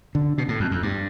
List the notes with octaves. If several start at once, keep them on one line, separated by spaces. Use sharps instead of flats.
D3
B2
A2
F2
F2
G2